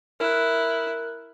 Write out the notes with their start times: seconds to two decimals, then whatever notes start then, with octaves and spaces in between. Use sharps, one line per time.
0.20 E4 A#4 F6 F#6